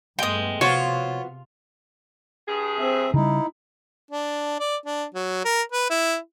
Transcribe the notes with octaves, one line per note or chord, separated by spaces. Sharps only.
G2 G#3 A3 B3 G5 D#6
C3 F3 B3 F4 F#4 C#5
G2 G#4
C4 E5
C#3 G3 D#4 E4
D4
D5
D4
F#3
A#4
B4
E4